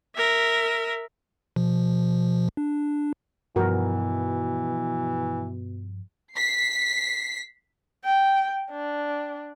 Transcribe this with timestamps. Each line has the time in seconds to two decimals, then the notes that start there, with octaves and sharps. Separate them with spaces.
0.16 A#4 E5
1.56 B2 F3
2.57 D4
3.56 G2 B2 E3 F3 F#4 A#4
6.34 B6 C7
8.05 G5
8.71 D4